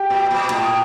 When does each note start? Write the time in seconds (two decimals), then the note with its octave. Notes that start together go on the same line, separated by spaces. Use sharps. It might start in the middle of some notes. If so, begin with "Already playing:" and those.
Already playing: G4
0.10 A#2
0.31 A#2
0.50 A2